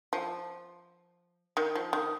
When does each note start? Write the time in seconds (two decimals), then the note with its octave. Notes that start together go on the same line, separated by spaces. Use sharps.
0.13 F3
1.57 D#3
1.75 F3
1.93 D#3